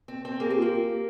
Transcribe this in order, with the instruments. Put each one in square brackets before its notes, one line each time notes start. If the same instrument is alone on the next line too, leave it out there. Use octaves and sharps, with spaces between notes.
[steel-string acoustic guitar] C4
C4
[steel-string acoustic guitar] A#3 [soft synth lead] G#4
[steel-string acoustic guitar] C4 [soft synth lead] G4
[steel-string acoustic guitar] A#3 [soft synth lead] F4
[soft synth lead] G4